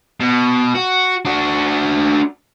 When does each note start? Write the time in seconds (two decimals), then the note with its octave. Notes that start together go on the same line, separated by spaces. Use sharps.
0.20 B2
0.74 F#4
1.25 D4 F#4